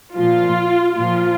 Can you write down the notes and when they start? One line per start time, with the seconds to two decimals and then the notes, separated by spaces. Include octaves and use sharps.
0.16 A#2 F3 F4
0.98 A#2 F3 F4